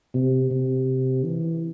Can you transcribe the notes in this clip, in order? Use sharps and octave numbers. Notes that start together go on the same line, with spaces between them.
C3
C3
E3